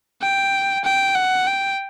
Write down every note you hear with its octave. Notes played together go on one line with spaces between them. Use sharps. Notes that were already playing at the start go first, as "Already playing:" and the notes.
G5
G5
F#5
G5